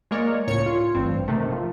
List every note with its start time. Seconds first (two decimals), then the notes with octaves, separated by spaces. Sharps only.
0.11 G#3 A#3 A#4 C#5 D5
0.47 C#2 A2 C#5 C#7
0.66 F4
0.95 A1 G2 C4
1.28 C3 D#3 A3
1.52 F3